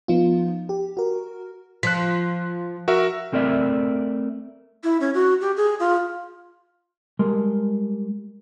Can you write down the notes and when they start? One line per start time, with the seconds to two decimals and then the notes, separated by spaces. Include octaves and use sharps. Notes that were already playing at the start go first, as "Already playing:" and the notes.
0.08 F3 B3 D#4 F4
0.69 G4
0.97 F#4 A#4
1.83 F3 F#6 B6
2.88 F#4 A#4 E5
3.33 A3 C4 A#4 D5 E5
4.84 E4
5.01 C#4
5.14 F#4
5.41 G4
5.57 G#4
5.80 F4
7.19 G3 G#3 A#4 C6